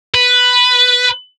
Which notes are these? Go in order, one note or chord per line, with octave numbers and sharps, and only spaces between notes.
B4